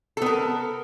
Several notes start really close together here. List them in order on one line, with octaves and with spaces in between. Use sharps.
A4 B3 A#4